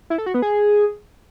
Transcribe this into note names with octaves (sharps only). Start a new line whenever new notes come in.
E4
A4
F#4
B3
G#4